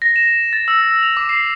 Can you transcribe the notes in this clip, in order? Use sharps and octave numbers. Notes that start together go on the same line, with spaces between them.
A#6
E7
A6
E6
F7
D6
C7